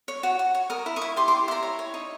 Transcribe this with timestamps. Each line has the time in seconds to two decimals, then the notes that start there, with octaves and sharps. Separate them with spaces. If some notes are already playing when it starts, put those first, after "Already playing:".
0.08 C#5
0.23 F#4
0.39 F#4
0.55 C#5
0.70 A#4 D#6
0.86 E4
0.96 C#6 D#6
1.02 E4
1.16 G4 C6 D6
1.28 C6 D6
1.32 G4
1.48 E4 A#5 C6
1.63 C#5
1.79 C#5
1.94 D#4